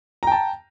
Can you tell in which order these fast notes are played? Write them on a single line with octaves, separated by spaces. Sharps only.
A#5 G5 A5